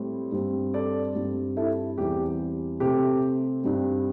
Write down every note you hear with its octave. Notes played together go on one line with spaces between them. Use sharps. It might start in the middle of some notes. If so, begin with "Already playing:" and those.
Already playing: A2 G3 C4
G2 G3 C4
A4 D5
G2 G3 C4
E4 A4
E2 E3 G3 C4 G4
C3 A3 C4 G4
G2 G3 C4